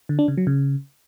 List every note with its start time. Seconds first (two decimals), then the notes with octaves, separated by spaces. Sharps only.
0.09 D3
0.19 D4
0.28 C#3
0.37 F#3
0.47 C#3